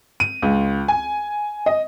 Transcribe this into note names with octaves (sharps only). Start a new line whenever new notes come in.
D#7
C#2
G#5
D#5